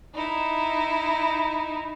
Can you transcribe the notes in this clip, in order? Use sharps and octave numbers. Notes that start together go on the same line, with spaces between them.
D#4 E4